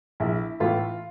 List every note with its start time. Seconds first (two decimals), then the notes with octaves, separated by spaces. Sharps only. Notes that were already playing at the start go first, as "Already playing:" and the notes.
0.20 A#1 E4
0.60 A2 E3 A3 F4